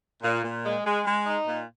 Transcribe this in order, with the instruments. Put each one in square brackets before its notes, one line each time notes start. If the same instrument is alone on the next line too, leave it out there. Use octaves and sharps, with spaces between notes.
[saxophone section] A#2
A#2
G#3
G#3
G#3
D#4
A#2